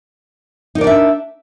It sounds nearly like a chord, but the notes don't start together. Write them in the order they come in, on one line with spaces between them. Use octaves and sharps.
D#4 A#4 D5 D4 E5